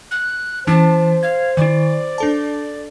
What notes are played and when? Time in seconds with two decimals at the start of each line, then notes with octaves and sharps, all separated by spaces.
0.11 F#6
0.67 E3 C#4 E4 C5 A5
1.23 F5 G#6
1.57 D#3 E4 D5
2.18 D4 A4 A5